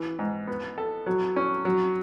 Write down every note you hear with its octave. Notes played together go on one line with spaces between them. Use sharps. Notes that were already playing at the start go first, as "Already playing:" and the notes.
Already playing: E3
G#2
B3
A4
F#3
C#4
F#3